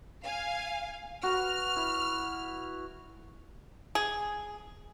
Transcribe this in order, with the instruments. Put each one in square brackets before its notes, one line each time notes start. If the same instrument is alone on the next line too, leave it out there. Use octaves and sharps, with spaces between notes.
[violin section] F5 G#5
[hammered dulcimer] F#4 B4 [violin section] F6
[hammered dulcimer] E4
[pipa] G#4